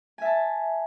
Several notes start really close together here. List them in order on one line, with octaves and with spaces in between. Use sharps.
G#5 E5 A5